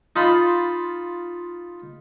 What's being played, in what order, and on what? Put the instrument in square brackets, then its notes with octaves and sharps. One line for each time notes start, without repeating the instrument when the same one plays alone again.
[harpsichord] D#4 F4 A5 B5 C6